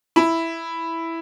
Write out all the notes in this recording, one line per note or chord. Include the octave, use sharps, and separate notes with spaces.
E4